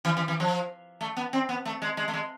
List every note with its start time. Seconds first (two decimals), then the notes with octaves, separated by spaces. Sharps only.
0.05 E3
0.17 E3
0.28 E3
0.40 F3
1.01 A3
1.17 B3
1.33 C4
1.49 B3
1.65 A3
1.82 G#3
1.97 G#3
2.08 A3
2.14 G#3